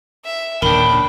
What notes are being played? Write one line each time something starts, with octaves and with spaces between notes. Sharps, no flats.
E5
D#2 A#2 C#3 D4 A#4 G5 B5